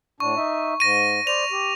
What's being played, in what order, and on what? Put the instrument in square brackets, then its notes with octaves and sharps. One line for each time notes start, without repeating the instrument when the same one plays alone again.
[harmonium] A2 D4 [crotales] C#6
[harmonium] D#4 E5
[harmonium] G#2 [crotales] A#6 D#7
[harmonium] C5 D5 [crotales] F7
[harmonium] G4